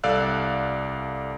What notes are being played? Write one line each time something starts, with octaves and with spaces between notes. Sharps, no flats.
C2 A4 D5 F5 E6 F#6